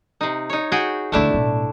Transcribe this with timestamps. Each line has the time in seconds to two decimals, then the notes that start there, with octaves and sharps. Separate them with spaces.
0.21 C3 D#4
0.50 D#4 C#5
0.72 F#4 G#4 G5
1.12 D2 A3 B3 D4 E4
1.34 B1 A2